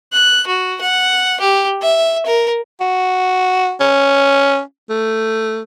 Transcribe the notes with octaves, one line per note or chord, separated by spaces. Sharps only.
F#6
F#4
F#5
G4
E5
A#4
F#4
C#4
A3